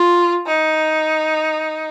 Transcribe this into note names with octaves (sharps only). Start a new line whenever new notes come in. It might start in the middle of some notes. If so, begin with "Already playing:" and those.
Already playing: F4
D#4